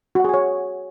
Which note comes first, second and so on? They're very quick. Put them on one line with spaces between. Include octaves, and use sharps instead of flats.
F#4 F#5 G#4 G#5 C#5